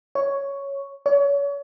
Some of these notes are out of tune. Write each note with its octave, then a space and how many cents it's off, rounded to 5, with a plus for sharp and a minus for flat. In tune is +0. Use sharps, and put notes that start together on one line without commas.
C#5 +5
C#5 +35